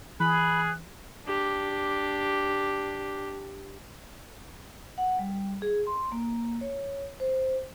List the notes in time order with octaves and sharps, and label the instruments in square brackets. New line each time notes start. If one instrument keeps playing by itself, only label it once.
[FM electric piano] E3 [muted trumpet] G#4 [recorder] B5 [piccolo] F#6
[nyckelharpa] D4 G4
[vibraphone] F#5
G3
G#4
C6
A#3
C#5
C5